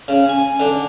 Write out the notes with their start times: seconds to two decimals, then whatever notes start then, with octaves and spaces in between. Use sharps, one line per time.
0.08 C#3
0.28 G#5
0.60 D3